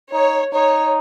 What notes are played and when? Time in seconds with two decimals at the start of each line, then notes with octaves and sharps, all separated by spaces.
0.13 D#4 C#5
0.53 D#4 C#5